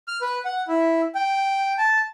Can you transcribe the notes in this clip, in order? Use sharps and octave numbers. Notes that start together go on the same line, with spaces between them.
F6
B4
F#5
E4
G5
A5